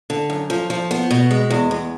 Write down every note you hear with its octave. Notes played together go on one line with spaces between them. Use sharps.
D3
F#2
F3
F3
B3
B2
G#3
E2
E2